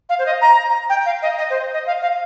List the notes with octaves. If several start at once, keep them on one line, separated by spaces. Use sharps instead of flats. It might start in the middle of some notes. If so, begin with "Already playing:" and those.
F5
C5
D#5
A#5
G5
F5
D#5
D#5
C5
D#5
F5
F5